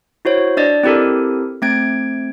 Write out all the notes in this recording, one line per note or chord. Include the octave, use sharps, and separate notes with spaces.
E4 F#4 C5 C#5
D4 D5 D#5
C4 E4 G4 A4 A#4
A3 C4 G#6 D7